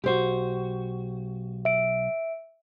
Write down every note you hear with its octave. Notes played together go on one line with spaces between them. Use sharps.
B1 F#4 G4 C5
E5 D7